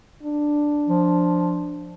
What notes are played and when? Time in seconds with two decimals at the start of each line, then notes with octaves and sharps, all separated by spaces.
0.23 D4
0.88 F3